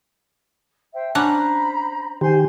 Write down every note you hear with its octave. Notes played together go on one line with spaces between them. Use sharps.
C5 E5 G5
C#4 D4 C5 F#5 A#5 B5
D#3 G4 C5 G#5 C6